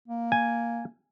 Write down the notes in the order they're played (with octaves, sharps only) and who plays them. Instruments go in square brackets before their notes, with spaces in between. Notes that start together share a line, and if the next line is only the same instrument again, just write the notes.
[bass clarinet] A#3
[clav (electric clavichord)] G#5